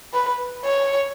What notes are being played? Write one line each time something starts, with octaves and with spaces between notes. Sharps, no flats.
B4
C#5